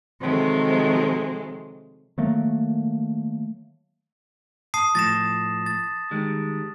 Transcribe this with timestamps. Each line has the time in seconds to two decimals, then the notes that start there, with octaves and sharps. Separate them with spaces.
0.20 C3 D#3 F3 F#3 G#3 A3
2.18 D#3 F#3 A3 A#3
4.74 A5 D#6 C7
4.95 A2 F3 A6 A#6 E7
5.66 A6
6.11 D#3 G3 G#3